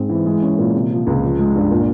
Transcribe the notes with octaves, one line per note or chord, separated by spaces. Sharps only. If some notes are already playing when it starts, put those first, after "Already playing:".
Already playing: G#2 G#3 C4
E3
G#3
C#4
A#2
C3
F3
C#2
F3
G#3
G2
A#2